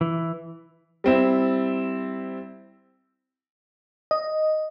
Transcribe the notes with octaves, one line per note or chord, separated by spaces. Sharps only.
E3
G3 C4 E4
D#5